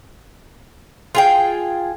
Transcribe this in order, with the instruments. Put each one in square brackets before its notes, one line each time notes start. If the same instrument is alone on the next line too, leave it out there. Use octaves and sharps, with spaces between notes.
[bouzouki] F4 G#4 G5